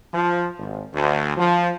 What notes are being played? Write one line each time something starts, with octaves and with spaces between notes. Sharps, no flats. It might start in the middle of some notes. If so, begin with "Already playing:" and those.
F3
G#1
D2
F3